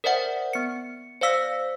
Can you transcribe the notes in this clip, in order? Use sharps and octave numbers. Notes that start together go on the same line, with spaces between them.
A#4 C5 D5 E5 F#5
B3 C#7
C5 D5 F5 E6 B6